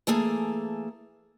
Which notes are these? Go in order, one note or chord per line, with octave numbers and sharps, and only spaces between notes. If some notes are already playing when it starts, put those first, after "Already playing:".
E3 A3 A#3 G#4 A4